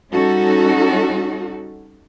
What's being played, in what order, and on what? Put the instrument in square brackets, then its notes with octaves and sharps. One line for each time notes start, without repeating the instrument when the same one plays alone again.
[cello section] G3 C#4 D#4 F#4 A4